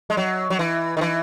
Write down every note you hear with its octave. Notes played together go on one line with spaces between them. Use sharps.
G#3
F#3
F#3
E3
D#3
E3